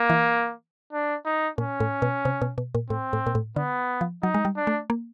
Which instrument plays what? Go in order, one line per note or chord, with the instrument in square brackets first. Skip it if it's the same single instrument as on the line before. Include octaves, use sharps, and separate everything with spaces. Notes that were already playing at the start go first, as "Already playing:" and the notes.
Already playing: [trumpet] A#3
[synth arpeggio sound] E3
[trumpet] D4
D#4
[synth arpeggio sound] A#2 [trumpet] C#4
[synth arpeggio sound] A2
B2
C3
B2
B2
A#2
[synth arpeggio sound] A2 [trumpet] C4
[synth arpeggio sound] A2
A#2
A2
[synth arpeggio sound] D3 [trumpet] B3
[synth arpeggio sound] F3
[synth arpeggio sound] F#3 [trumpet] D#4
[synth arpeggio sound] G#3
G3
[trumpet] D4
[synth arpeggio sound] A3
A#3